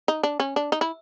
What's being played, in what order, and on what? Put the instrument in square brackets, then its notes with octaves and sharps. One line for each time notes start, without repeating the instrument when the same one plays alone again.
[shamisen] D#4
D4
C#4
D4
D#4
E4